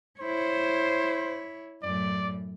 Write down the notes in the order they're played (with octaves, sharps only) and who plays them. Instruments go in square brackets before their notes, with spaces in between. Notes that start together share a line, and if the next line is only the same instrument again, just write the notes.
[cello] E4 C#5 [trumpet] C5
[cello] F#2 A2 [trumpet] D5